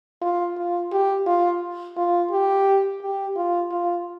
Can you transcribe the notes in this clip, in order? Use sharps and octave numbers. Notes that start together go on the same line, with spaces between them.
F4
F4
G4
F4
F4
G4
G4
F4
F4